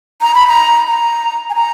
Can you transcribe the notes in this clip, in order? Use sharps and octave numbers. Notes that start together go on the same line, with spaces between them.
A#5
B5
A#5
A#5
G#5
A#5